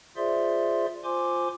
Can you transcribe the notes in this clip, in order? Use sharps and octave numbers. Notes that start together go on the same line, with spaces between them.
F4 G#4 C5 D5 E5 C6
F4 C5 G#5 C6 D6